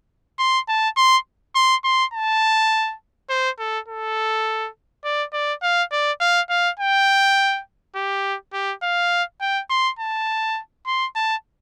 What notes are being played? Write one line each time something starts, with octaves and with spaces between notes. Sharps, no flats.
C6
A5
C6
C6
C6
A5
C5
A4
A4
D5
D5
F5
D5
F5
F5
G5
G4
G4
F5
G5
C6
A5
C6
A5